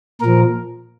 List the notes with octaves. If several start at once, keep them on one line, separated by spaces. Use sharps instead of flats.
A#2 F3 A#4